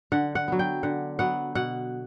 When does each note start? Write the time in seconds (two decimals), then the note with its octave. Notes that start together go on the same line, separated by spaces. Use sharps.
0.12 D3 F#5
0.35 F#5
0.48 F#3 B3
0.59 G5
0.83 D3 F#5
1.19 F#3 B3 F#5
1.55 B2 F#5